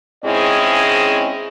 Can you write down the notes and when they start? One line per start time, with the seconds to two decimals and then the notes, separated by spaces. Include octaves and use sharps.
0.25 G#2 C4 C#4 E4 G#4 D#5